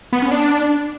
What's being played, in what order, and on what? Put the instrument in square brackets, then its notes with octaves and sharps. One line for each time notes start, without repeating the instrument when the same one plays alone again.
[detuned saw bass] B3
C#4
D4